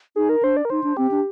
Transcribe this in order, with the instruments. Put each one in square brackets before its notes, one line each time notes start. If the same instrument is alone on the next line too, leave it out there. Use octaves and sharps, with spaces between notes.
[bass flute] D#4 [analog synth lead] G#4
[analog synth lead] A#4
[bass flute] D4 [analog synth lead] C5
[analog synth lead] D5
A#4
[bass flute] D#4 [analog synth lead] C5
[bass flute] D4
[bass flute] C4 [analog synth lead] G4
[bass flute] D4